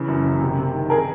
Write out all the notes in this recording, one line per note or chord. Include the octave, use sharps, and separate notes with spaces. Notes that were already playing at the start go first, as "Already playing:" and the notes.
Already playing: C#3 E3
F#2
F#1
C3
C3
D#3
G#4 A#4